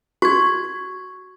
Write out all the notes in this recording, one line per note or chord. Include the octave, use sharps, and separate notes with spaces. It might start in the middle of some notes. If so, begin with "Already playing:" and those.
F#4 C#6 G#6